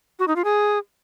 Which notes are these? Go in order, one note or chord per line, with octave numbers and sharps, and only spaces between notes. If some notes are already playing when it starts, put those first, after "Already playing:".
F#4
D#4
F4
G#4